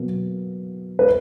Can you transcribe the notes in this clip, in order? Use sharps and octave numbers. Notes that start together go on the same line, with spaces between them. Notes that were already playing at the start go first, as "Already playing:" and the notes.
Already playing: B2 F#3 A#3
B4